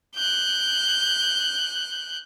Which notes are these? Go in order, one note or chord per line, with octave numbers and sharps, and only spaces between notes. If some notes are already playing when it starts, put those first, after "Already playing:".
F#6 G6